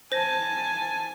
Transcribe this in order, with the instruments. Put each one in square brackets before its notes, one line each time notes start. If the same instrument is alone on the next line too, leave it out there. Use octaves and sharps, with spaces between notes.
[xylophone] C5 A#6 [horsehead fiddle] G#5 A5